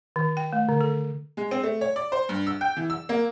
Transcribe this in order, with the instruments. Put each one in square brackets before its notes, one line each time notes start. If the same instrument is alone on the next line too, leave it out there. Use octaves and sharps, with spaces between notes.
[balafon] D#3
G5
A3
D3
A4
[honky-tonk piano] G#3
C4
A3
C#5
D5
C5
G2
E6
G5
E3
E6
A#3